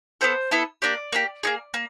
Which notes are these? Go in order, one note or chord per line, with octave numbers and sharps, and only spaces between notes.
B3 E4 A4 C5
B3 E4 A4
A#3 D4 G4 D5
A#3 D4 G4
A#3 D#4 G#4
A#3